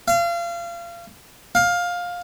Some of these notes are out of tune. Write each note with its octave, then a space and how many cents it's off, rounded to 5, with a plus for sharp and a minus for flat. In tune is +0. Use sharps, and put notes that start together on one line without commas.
F5 -30
F5 +15